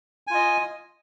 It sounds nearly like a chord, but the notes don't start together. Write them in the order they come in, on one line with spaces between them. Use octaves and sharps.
G#5 F4 D#5